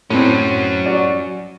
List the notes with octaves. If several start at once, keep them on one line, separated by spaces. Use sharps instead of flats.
A2 F#3 C4 C#4
F#4 D5